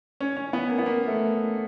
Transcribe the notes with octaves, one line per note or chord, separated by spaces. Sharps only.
C#4
C#4
B3
A#3
B3
A#3
A3